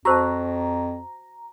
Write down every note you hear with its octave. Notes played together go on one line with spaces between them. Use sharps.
F2 F#4 C5 A5 A#5 C#6 E6 F#6